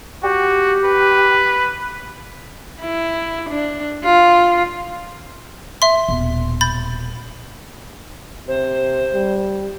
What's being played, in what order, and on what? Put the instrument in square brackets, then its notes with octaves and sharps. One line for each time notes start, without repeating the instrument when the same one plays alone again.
[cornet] F#4 [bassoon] G4
[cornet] B4
[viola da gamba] E4
D4
F4
[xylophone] E5 C6
[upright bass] D#1 B2
[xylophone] B5 G6 A6
[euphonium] C3 [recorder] C5
[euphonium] G3